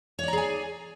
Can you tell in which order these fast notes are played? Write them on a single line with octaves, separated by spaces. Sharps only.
C#5 D5 A#5 G#4 G#5